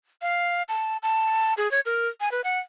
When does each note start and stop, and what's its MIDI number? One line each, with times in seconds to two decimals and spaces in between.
0.22 0.62 77
0.68 0.97 81
1.03 1.54 81
1.57 1.70 68
1.71 1.80 73
1.86 2.08 70
2.20 2.31 80
2.31 2.41 71
2.44 2.58 78